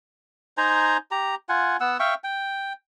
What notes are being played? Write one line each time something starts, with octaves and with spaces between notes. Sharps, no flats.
D#4 C5 G#5 A#5
G4 A#5
F4 F#5 G#5
B3 F#5 E6
E5 F5 G5 C#6
G5